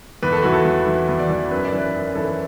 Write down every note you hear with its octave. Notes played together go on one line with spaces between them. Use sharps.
E2 B4
A4
E3 F#4
A4
E2
E3
E2
D5
E3
F#2 B4
D5
E3
B4
F#2
E3 A4